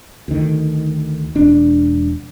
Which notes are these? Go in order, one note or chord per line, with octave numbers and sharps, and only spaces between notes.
D2 D#3
E1 D4